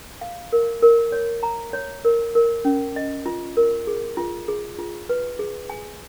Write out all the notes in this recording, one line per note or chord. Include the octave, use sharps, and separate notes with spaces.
F5
A#4
A#4
C#5
A#5
C#5
A#4
A#4
C#4
D#5
F4
A#4
G#4
F4
G#4
F4
B4
G#4
G#5